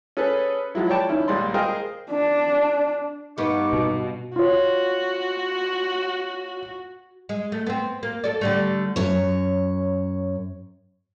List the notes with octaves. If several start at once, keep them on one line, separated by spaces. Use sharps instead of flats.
C#4 G#4 A4 B4
F3 F#3 G#3 E4
C#5 D5 G5 A5
D#3 C#4 E4
A#1 G3 G#3 D5 C6
G#4 A#4 C5 D#5 F5 G5
D4
G2 B3 D#4 C#6 D6
B2
F4 F#4 C#5
G#3
A3
B3 C4
A#3
A4 D5
D3 G3 A3
F#2 C#5